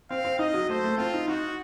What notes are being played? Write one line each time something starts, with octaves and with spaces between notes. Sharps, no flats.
C4 F5
C4
D#4 D#5
F#3
A3 C5
A3
C4 F4
D#4
D#4 F#4